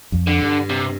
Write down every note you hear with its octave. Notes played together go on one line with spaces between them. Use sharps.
F2
D3
G2
C3